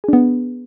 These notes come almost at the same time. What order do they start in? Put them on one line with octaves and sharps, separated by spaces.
G#4 D4 B3